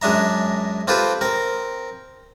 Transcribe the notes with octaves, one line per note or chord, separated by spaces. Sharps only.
F#2 G#3 D4 E5 A#5
C4 F4 G4 A4 B4 C5
C4 A#4